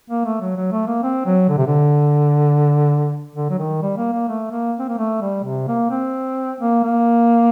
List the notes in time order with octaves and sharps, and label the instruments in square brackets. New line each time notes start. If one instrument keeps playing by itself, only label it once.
[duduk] A#3
A3
F#3
F#3
A3
A#3
C4
F#3
D3
C3
D3
D3
F#3
D#3
G3
A#3
A#3
A3
A#3
C4
A#3
A3
G3
C3
A#3
C4
A#3
A#3